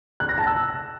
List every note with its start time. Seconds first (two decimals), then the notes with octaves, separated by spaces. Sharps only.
0.20 F#6
0.29 A#6
0.38 A5
0.47 E6